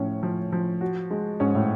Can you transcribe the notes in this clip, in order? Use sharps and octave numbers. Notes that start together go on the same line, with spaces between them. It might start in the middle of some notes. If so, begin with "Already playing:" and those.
Already playing: A2 F3 C#4
F3
F3
F#4
G#3
G#2 C#4
A2